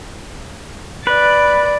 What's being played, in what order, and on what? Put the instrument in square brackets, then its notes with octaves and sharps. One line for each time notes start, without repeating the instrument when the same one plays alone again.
[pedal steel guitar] B4 [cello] D5